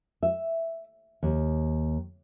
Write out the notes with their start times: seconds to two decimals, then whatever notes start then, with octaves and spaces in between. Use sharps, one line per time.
0.23 E5
1.23 D#2